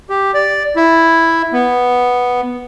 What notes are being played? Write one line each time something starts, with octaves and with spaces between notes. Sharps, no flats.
G4
D5
E4
B3